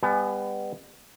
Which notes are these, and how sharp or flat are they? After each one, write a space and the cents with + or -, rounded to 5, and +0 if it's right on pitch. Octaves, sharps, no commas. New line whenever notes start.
G3 +40 B3 +20 G#5 +10